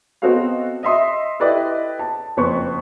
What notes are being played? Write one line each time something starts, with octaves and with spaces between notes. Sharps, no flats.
B3 C4 F#4 A4 D#5 F5
D#5 E5 C6 D#6
E4 G4 A4 B4 D5 D#5
A5
F#1 F2 B4 C5 C#6